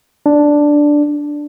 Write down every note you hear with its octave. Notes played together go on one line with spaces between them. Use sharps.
D4